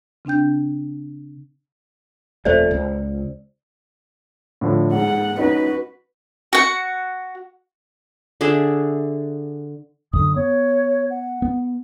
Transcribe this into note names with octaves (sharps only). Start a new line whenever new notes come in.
C#3 C4 D4 G5 G6
D#1 F2 A3 C5 D5
C#2
A2 D3 F3
G#2 F#5
C#4 D#4 F#4 B4
F#4 F#5
D3 D4 G#4 E5
F#2 D3 D#6
B3 C#5
F#5
B3